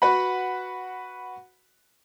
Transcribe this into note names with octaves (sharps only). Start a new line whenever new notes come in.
F#4 B4 F#5 B5